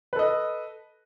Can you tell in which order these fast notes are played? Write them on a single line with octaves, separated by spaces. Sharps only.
B4 A4 D#5